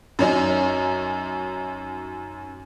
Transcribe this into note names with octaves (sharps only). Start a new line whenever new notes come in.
F#2 C#4 D#4